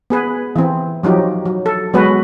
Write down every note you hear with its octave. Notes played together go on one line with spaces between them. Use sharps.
B3 G#4 B4
E3 C4
F3 F#3 D#4 G4
F#3
A4
F#3 G#3 B3 F#4 B4